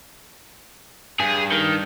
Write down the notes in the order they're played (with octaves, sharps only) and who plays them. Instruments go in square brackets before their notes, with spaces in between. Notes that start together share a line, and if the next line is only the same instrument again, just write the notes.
[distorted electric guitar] G2 [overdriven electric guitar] G#4
[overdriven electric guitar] D#3